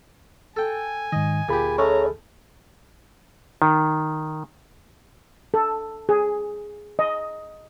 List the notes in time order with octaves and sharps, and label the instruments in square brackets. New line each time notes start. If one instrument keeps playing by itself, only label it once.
[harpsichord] A4 G5 [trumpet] G#5
[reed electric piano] G#2 D#3 [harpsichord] D#5
[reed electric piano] D2 G#4 B5 [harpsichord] A#2 G4
[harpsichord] G#3 A3 C#4 [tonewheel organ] C#5 [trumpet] A#5
[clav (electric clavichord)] D#3
[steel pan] A4
G#4
D#5